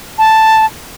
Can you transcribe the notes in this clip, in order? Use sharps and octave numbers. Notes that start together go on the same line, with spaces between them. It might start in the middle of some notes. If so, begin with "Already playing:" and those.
A5